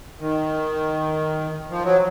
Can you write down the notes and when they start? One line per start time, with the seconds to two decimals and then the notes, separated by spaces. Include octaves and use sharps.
0.19 D#3
1.70 F3
1.83 F#3